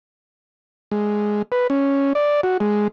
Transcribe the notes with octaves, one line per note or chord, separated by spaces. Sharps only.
G#3
B4
C#4
D5
F#4
G#3